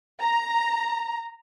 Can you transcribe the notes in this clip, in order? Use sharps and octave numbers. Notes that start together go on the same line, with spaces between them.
A#5